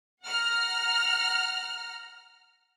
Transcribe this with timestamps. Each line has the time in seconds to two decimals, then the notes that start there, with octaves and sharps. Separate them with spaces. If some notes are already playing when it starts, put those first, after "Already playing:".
0.23 F#5 A#5 F6